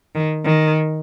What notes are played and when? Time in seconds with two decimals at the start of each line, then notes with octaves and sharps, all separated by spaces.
0.15 D#3
0.45 D#3